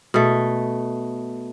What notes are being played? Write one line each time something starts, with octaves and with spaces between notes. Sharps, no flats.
B2 A3